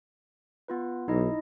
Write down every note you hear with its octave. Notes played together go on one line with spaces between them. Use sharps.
B3 F4 B4
B1 D#4 E4 D#5